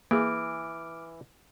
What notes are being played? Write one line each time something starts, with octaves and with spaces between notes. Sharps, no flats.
E3 A#3 G#4 D6 F6 D7